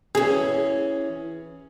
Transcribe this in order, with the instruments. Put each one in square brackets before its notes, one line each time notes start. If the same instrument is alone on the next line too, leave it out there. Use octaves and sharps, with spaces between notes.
[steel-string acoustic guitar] E3 C#4 [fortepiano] G#4